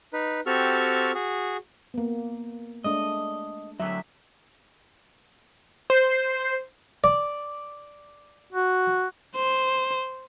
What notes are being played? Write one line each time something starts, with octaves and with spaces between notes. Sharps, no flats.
D#4 B4
C4 F#4 G4 A4 C#6 F6
F#4 G#4
A#3 B3
G#3 A3 D4 D#5
D3 F#3 E5
C5
D5
F#4
C5